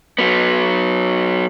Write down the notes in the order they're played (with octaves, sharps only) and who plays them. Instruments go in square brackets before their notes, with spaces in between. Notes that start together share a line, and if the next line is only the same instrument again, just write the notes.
[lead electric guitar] F#3 B3